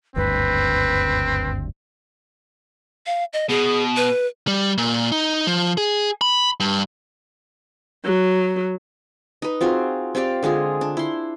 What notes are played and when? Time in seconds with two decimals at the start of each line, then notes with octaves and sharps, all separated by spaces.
0.16 F#1 D2 G2 C4 B4
3.06 F5
3.33 D#5
3.49 B2 G#4
3.97 B4
4.48 G3
4.78 A#2
5.12 D#4
5.47 F3
5.78 G#4
6.21 B5
6.60 G2
8.05 F#3
9.42 D#4 B4
9.61 C4 F4 F#4 G#4
10.15 C4 G4 D5 F5
10.43 D3 G#3 F4 G#4
10.81 D4
10.97 E4 C6